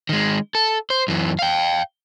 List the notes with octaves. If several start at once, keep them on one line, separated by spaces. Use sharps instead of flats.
D#3 G#3
A4
C5
F#2 E3
F5 G5